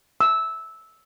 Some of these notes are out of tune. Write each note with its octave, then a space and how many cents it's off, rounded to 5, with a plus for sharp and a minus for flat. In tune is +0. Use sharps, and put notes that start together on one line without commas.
E6 -10